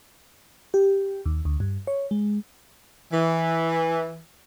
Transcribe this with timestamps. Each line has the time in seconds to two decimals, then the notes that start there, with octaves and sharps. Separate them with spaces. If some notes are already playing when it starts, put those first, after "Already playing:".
0.74 G4
1.26 D#2
1.45 D2
1.60 G2
1.87 C#5
2.11 G#3
3.13 E3